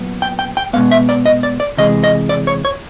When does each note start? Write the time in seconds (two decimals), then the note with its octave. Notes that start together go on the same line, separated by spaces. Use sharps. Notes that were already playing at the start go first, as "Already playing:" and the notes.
Already playing: A#2 F#3 B3
0.22 G5
0.39 G5
0.57 G5
0.73 B2 G#3 B3 F5
0.91 E5
1.09 D5
1.26 D#5
1.43 D5
1.60 D5
1.77 C3 E3 G#3 D#5
2.04 D#5
2.29 D5
2.47 C#5
2.65 C#5